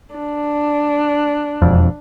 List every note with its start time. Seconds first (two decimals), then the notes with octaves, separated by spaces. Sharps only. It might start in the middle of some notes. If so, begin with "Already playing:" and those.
0.15 D4
1.62 E1 F2